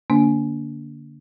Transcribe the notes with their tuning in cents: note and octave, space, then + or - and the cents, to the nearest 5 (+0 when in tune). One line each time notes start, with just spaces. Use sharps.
D3 -5 A#3 +0 D4 -25